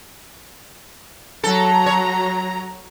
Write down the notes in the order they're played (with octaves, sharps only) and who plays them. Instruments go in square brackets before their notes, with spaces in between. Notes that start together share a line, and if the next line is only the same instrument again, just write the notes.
[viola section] F#3 A#5 [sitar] A4
[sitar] C#5